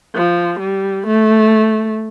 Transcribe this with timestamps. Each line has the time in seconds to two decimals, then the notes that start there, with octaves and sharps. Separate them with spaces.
0.15 F3
0.60 G3
1.06 A3